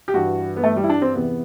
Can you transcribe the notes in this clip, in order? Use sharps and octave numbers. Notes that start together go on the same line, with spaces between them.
G4
G2 E3 F#4
B3
A3
G3
E4
D4
C4
E2 C3 E3 B3